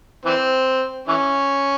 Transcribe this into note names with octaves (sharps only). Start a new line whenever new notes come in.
E3 C4
E3 C#4